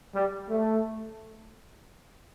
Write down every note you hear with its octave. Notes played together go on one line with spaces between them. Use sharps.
G3
A3